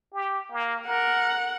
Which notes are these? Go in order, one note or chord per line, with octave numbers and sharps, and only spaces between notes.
G4
A#3
A#4 F#5